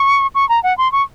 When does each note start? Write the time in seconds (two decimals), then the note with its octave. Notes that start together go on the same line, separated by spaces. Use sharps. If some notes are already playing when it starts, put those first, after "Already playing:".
Already playing: C#6
0.35 C#6
0.49 A#5
0.63 F#5
0.78 C6
0.92 C#6